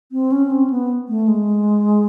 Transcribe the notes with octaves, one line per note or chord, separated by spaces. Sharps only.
C4
C#4
C4
B3
A3
G#3